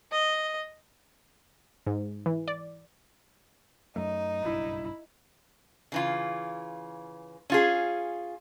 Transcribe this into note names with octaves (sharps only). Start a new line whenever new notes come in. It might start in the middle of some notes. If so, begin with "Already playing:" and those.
D#5
G#2
E3
D5
F#2 F#3 A3 D#4
F#1 B1 G2 E4
C#3 E3 F4
C#4 F4 G#4